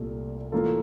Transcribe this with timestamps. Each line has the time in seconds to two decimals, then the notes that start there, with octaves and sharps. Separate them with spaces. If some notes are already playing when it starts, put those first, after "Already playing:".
Already playing: C2 A#2 A3
0.52 A2 E3 A#3 F4 A4